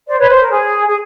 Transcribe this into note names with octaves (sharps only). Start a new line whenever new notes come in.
C5 D5
B4 C#5
C5
A#4
G#4
G#4